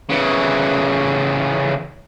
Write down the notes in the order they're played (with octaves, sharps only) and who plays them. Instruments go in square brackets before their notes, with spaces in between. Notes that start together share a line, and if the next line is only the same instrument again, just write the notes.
[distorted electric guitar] C#3 E3